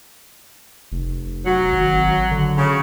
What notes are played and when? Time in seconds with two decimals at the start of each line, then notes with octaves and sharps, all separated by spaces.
0.92 F1
1.46 F#3
1.72 G#1
2.31 D3
2.57 C#3